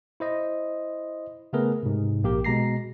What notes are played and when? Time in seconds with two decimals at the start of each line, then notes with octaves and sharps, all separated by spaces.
0.20 E4 C5 D#5
1.53 C#3 A3 B3 G#4 A#4 B4
1.83 G#2 C3
2.23 A#1 A#3 G4 A#4
2.44 B2 G#3 A#5 A#6 C7